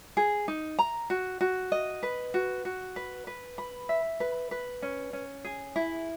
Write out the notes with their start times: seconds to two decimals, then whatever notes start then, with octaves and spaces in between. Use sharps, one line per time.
0.17 G#4
0.48 D#4
0.79 A#5
1.10 F#4
1.41 F#4
1.72 D#5
2.03 B4
2.34 F#4
2.65 F#4
2.96 B4
3.27 B4
3.58 B5
3.89 E5
4.20 B4
4.51 B4
4.82 C#4
5.13 C#4
5.45 G#4
5.76 E4